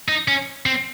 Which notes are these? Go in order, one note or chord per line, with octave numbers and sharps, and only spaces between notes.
D#4
C#4
C4